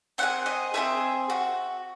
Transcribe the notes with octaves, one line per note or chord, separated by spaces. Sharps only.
C4 E4 G#4 F#5
D#5
C4 E4 G#4 E5
F#4